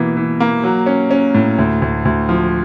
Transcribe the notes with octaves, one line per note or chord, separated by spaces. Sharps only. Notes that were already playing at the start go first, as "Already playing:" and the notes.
Already playing: B2 E3 A#3
E3
A#3
F#3
C#4
C#4
A2
D2
D2
D2
F3